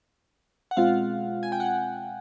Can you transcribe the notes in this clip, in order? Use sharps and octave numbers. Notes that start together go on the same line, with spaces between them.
F#5
B2 G#3 C4 F4 F5
G#5
G5
F#5